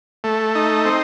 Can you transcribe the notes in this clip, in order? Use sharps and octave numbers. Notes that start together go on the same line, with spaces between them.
A3
D#4
C4